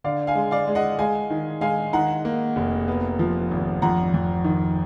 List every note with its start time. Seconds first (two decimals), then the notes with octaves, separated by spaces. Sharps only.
0.04 D3 D5 F5
0.27 F5 G#5
0.35 G#3
0.51 D5 F5
0.67 G#3
0.75 D#5 F#5
0.99 G#3 F5 G#5
1.30 D#3
1.61 G#3 F5 G#5
1.93 D#3 F#5 A#5
2.25 A#3
2.56 F1
2.88 B3
3.19 F3
3.51 G#1
3.82 F2 F#5 A#5
4.14 F2
4.44 D#3